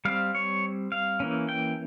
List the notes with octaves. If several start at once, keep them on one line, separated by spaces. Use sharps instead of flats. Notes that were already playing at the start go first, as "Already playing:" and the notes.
G3 C4 F5
C#5
F5
E3 A#3 C#4
G5